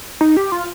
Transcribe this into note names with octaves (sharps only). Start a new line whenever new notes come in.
D#4
G4
F4